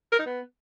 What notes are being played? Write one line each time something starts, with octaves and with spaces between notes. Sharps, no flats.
A#4
D#4
B3